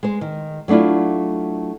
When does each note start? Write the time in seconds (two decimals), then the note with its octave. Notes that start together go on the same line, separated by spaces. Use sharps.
0.03 G#3 C5
0.21 D#3
0.68 F#3 A3 D4 E4 F4